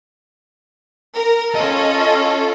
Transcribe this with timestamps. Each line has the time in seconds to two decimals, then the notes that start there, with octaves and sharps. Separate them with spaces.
1.15 A#4
1.55 C#4 F4 A4 D#5